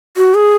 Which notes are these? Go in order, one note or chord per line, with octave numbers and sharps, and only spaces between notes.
F#4
G#4